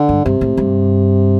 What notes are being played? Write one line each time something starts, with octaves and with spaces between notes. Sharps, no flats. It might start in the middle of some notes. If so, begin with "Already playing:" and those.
Already playing: D3
G2
G2 C3
A2
G2